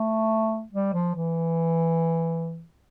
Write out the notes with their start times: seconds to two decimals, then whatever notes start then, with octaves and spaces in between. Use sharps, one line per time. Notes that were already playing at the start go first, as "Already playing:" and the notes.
Already playing: A3
0.73 G3
0.93 F3
1.15 E3